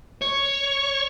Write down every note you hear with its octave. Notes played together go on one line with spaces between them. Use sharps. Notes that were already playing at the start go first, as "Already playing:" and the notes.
C#5